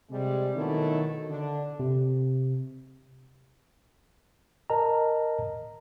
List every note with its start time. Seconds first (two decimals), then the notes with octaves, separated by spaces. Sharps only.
0.10 C3 G3 G#3
0.56 B2 D#3 F#3 A3 E4 A4
1.29 D3 D4
1.80 C3
4.70 A#4 D#5 A5 A#5